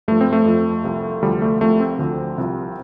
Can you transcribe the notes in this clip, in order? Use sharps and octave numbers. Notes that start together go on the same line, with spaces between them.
G2 F3 A3
C4
A3
F2 F3
C2 C3 F3
D2 D3 F3 G3
A3
C2 C3 F3 A3
C4
D2 D3 F3
C2 C3 F3